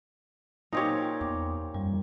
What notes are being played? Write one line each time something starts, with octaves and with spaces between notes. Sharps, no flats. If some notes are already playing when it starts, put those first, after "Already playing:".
A#2 C4 D#4 G4 C#5
E2 D6
F#2 G3